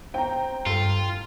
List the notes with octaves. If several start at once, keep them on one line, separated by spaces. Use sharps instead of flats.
C4 G5 A#5
G2 F4 A4